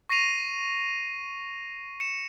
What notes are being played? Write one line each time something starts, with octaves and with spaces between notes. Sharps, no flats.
C#6 A#6 C7 D#7 F7
C#7 E7